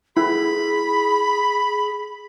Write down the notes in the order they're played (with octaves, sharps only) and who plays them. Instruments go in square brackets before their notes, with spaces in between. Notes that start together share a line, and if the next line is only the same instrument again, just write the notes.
[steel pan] E4 [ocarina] G#4 [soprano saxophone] B5